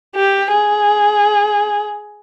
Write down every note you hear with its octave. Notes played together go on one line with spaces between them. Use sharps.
G4
G#4